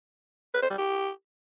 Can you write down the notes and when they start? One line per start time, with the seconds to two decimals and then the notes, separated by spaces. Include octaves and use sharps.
0.54 B4
0.62 C5
0.70 G3
0.78 G4